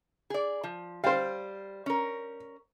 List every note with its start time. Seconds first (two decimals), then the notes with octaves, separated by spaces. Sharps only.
0.30 G#4 D5
0.63 F3
1.04 G3 C5 F5 G5
1.86 C#4 A#4